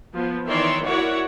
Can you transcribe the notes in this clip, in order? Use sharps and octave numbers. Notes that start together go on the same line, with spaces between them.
F3 B3
D#3 E3 C#5 D5 E5 C6
E4 F#4 A#4 C#5 D5 F#5